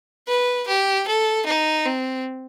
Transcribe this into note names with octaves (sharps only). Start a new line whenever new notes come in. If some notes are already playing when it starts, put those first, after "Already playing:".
B4
G4
A4
D#4
C4